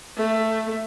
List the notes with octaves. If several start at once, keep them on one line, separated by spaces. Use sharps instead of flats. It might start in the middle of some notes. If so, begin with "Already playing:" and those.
A3